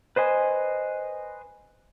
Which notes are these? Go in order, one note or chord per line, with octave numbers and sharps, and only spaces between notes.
B4 C5 D#5 G#5